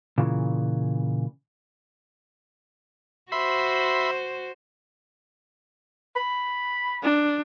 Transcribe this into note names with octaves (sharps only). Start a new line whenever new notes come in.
A#2 C#3 E3
F#4 C5 E5 B5 C6
B5
D4